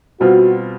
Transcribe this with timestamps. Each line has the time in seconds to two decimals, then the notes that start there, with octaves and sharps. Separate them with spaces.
0.20 B2 G3 C4 F4 F#4